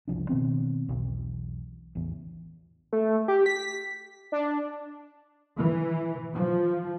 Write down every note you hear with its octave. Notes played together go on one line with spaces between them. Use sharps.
F#1 C2 F3 D4
B2 D#3 B3 C4
B1 E2
A1 E2
A3
G4
B6
D4
E3
F3